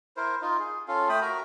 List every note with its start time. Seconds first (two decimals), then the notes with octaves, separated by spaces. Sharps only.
0.17 E4 A#4 C5
0.42 D#4 F4
0.59 G#4
0.88 C#4 F4 A4 F5
1.09 A3 G5 B5 D#6
1.22 F#4 A#4 A#5